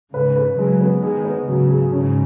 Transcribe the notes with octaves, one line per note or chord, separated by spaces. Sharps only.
G#2 C#3 B4
B4
C#3 F#3 G#3
B3
D#3 G#3 G#4
B3
G#2 C#3 F#3
G#4
G#2 C#3 C#4